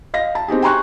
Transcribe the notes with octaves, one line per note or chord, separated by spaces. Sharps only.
D#5 F5 A#6
A5
C4 D#4 G4 G#4
G5 G#5 A#5 C6 C#6 F#6